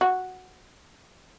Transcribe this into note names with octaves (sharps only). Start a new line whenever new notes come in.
F#4